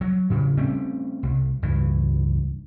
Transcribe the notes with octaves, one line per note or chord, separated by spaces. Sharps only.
F#3
A2 C#3
G3 A3 C4 C#4
C2
C#2 G2 E3